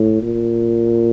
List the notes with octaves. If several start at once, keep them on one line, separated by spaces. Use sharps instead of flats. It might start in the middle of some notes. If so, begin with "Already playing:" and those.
Already playing: A2
A#2